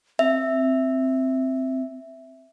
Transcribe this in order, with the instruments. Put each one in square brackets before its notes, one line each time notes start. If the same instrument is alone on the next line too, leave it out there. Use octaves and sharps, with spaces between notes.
[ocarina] C4 [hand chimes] E5